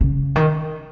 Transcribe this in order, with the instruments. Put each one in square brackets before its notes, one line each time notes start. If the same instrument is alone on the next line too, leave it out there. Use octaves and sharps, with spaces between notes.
[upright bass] C#3
D#3